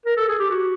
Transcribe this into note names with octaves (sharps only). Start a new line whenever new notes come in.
A#4
A4
G#4
G4
F#4